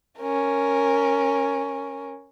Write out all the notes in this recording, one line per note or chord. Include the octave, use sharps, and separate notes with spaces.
C#4 A#4